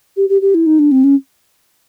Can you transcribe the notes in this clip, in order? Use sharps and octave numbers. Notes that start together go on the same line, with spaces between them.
G4
G4
G4
E4
D#4
D4
C4
C#4